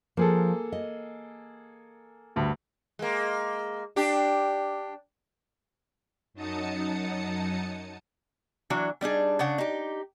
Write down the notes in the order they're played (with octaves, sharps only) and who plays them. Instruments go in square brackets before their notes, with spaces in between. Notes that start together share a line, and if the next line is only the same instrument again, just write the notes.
[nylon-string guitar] F3 [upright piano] A#3 G#4 A4
[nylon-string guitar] D#5
[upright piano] D2 G2
[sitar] G#3 A#3
D4 G4
[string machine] F#2 F#3 D#4 A5 D#6 C#7
[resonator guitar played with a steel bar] E3 F#3 D4 F#4
G3 D4 D#4 G#4
C#3 D4 F#5
D#4 G4